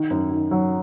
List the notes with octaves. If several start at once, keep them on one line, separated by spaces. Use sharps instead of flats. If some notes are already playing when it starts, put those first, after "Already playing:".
Already playing: D#3
F#2
D#3
F#3